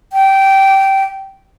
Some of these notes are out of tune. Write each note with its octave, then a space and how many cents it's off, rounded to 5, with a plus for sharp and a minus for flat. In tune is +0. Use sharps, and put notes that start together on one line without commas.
G5 -15